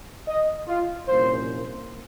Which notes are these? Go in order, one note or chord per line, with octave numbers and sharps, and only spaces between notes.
D#5
F4
C2 A#2 F3 A#3 C#4 C5